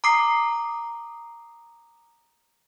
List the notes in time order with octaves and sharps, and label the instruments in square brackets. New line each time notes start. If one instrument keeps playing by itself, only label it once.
[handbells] A#5 D6 D#6 C7